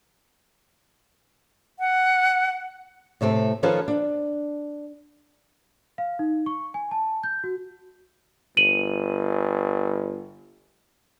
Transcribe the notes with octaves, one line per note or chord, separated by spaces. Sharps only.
F#5
A2 C3 A3 C4
D#3 F3 C#4 F4 A4 B4
D4
F5
D#4
C#6
G#5
A5
G6
F#4
G1 D#7 F#7